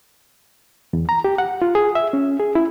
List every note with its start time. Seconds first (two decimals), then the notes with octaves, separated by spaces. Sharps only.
0.93 E2
1.09 A#5
1.24 G4
1.38 F#5
1.62 F4
1.75 G#4
1.95 E5
2.13 C#4
2.39 G#4
2.55 E4